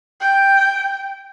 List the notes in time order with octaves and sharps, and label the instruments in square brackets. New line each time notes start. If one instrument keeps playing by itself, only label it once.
[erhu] G5